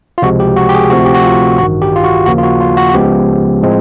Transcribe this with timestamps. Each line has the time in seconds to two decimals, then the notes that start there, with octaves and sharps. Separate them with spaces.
0.18 F4
0.22 C#2 C3 F3 G#3 F#4
0.40 G4
0.56 F#4
0.69 G4
0.74 G#4
0.90 D2 C3 F3 A3 C4 F#4
1.05 G4
1.14 F#4
1.24 F4
1.58 A1 G2 D#3 F#4
1.82 G4
1.96 F4
2.04 F#4
2.26 D#2 C#3 F3 A#3 F#4
2.38 F4
2.43 F#4
2.61 F4
2.77 F#4
2.89 F#4
2.94 C#2 C#3 F3 G#3 B3 G4
3.62 A2 F3 G#3 C4